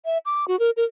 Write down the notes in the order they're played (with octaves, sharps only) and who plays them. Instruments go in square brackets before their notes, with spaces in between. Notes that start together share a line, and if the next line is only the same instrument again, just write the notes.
[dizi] E5
D6
F#4
A#4
A#4